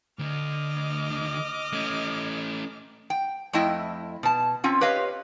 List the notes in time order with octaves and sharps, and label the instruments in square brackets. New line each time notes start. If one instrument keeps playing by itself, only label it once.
[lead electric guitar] D2 D3 [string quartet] D#5 D6 F6
[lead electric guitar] A3 C#4
[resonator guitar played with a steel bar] G5
F2 A3 E4 D#5 G5
B2 A5
C4 C#4 F4
G4 B4 C#5 D#5 F5